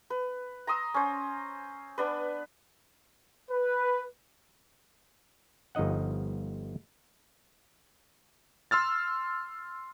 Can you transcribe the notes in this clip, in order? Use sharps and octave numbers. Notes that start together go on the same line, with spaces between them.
B4
A#5 C6 D#6 E6
C#4 C5
B3 D4 B4
B4
G1 F3 D#4 D#5 F#5
C6 E6 F6 A6